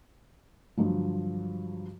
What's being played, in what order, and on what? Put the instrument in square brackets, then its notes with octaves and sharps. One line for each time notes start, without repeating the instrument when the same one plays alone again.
[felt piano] G2 D3 F3 F#3